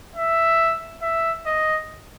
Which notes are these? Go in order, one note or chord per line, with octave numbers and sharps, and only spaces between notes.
E5
E5
D#5